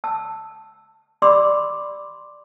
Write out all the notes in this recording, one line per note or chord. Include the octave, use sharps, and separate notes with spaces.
A5 E6
G4 D5 B5 C6 D6 E6